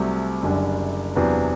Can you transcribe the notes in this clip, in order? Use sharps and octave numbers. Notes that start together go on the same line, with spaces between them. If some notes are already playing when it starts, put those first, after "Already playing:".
Already playing: C2 C3 F#3 A3
F#1 F#2 D3 G3 D4
E2 C3 F#3 B3 D4